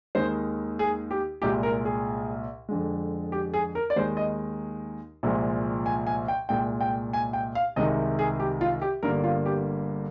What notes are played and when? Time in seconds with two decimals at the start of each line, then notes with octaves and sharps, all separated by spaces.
0.15 D#2 D#3 G#3 C5
0.79 G#4
1.11 G4
1.42 C2 A#2 G#3 G4
1.63 A#4
1.85 G#4
2.69 F2 D3 G#3
3.32 G4
3.54 G#4
3.75 A#4
3.90 D5
3.96 D#2 D#3 G#3 C5
4.17 D#5
5.23 C2 A#2 F3 G#3
5.86 G#5
6.07 G#5
6.28 G5
6.49 C2 A#2 G#3 G5
6.81 G5
7.13 G#5
7.33 G5
7.55 F5
7.76 C2 C3 D#3 G#3 D#5
8.19 G#4
8.40 G4
8.61 F4
8.82 G4
9.03 G1 G2 D3 G3 A#3 A#4
9.24 F4
9.46 G4